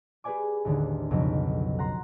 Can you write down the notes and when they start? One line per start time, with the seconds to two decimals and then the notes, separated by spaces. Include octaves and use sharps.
0.24 G4 G#4 B4 D5 G#5 D6
0.65 A1 D#2 D3
1.11 B1 F2 C#3 F#3
1.79 F#5 A#5 C6